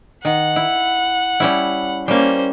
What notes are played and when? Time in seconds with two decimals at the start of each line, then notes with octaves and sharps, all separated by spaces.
0.25 D#3 F#5
0.56 E4
1.40 G3 C#4 E4
2.08 G3 A#3 C#4 C5